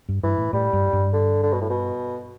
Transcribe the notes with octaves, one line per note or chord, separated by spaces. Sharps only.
G2
G2 E3
A2
A2 G3
G2
G2
D3
D3
B2
A2
B2